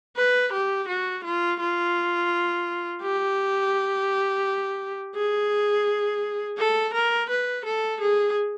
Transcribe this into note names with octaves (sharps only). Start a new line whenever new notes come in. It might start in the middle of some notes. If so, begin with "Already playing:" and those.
B4
G4
F#4
F4
F4
G4
G#4
A4
A#4
B4
A4
G#4